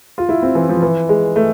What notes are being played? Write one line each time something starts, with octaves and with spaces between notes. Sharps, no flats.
F4
E4
C4
E3
F3
E3
G#3
A3